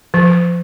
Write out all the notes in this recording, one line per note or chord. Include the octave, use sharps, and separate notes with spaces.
F3